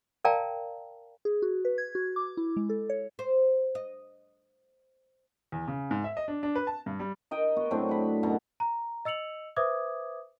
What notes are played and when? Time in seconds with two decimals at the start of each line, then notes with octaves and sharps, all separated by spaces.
0.25 A#4 D5 F5 G5 A5 A#5
1.25 G#4
1.42 F#4
1.65 B4
1.78 G#6
1.95 F#4
2.16 D6
2.37 E4
2.57 G#3
2.69 A4
2.90 C#5
3.19 C5
3.75 D#5
5.52 E2
5.68 C#3
5.91 G#2
6.04 E5
6.17 D#5
6.28 D4
6.43 D4
6.55 B4
6.67 A5
6.86 G2
7.00 G3
7.31 A#4 D#5 G5
7.56 B3 F#4
7.71 A2 F#3 C4 D4
7.89 F#5 B5
8.23 F#2 B2 B3 A#5
8.60 A#5
9.05 D#5 E6 C#7 F7 F#7
9.56 B4 C5 E5 D6 D#6 G#6